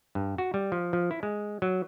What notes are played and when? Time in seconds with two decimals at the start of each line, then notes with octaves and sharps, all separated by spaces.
0.15 G2
0.38 F#4
0.54 G3
0.72 F3
0.93 F3
1.11 E4
1.23 G#3
1.62 F#3